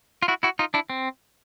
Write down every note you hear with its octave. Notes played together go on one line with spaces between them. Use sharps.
F4
E4 F#4
E4 F#4
D#4 F4
D4 E4
C4